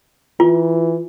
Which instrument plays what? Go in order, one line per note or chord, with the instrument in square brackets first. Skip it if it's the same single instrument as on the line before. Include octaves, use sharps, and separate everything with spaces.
[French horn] E3 [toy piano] F4